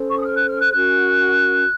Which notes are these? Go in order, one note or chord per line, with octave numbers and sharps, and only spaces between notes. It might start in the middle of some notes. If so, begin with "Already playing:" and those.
Already playing: C#4 A4 C5
C#6
D#6
F6
F#6
F6
F#6
C#4 F#4 A#4 F#6